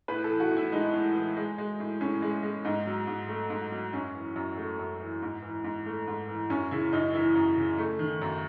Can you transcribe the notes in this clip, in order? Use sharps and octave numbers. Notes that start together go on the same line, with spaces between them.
A2 B4
A4
E3
F#4
A2
E4
G#3 D#4
A2
E3
G#3
G#3
A2
A2 C#4
G#3
G#3
G#2 D#4
F#3
G#2
A3
G#2
F#3
F#2 C#4
E3
F#2
A3
F#2
E3
G#2
E3
G#2
A3
G#2
E3
F#2 C#4
C#3 E4
F#2 D#4
E3 E4
F#2
C#3
A3
D#3
F#2